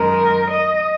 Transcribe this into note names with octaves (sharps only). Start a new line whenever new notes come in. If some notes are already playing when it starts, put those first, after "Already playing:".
Already playing: F#2 D#3 G#3 A#4
D#5